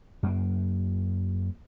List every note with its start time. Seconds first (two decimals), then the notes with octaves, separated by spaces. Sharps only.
0.23 F#2 A#3